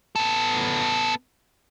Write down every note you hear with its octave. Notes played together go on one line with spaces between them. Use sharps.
B3 A4